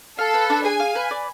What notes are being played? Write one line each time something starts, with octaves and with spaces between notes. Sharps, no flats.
A4 F5
B4
D4
G#4 G#5
F5
B4
D5